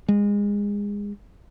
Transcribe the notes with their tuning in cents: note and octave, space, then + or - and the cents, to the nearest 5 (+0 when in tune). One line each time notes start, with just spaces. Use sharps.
G#3 -25